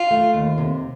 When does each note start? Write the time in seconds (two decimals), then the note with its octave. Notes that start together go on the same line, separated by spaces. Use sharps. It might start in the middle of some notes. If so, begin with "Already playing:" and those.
Already playing: F4
0.11 A3
0.34 D#2
0.58 C3